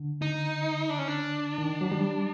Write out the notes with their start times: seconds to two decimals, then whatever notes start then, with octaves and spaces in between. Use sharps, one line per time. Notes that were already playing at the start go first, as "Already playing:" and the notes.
Already playing: D3
0.22 D#4
0.90 D4
0.99 C#4
1.08 D4
1.58 D#3
1.81 F#3
1.92 G3